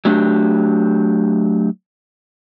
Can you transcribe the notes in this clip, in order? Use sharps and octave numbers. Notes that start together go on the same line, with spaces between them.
F#3 A3 D4 G4